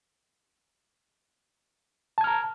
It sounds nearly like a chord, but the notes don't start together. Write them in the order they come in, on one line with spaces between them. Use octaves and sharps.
A5 G#6 F6 A#5